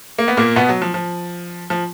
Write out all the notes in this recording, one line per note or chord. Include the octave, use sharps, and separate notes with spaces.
A#3
B3
A#2 A#3
B2 B3
F#3
F3
F3
F3